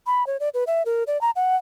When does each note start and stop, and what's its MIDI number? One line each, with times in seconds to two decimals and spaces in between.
0.07 0.26 83
0.27 0.37 73
0.40 0.49 74
0.54 0.64 71
0.67 0.83 76
0.86 1.03 70
1.07 1.20 74
1.21 1.31 82
1.36 1.56 78